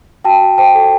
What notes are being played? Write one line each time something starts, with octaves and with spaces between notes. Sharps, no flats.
F#4 G5 A5
F#4
C5 G5 A5
A4